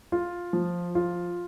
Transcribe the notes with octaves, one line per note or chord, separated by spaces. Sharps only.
F4
F3
F4